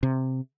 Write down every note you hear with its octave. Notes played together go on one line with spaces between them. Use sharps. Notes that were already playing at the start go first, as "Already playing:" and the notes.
C3